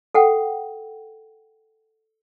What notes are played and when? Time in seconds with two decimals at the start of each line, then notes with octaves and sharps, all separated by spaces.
0.15 A4 F#5 G5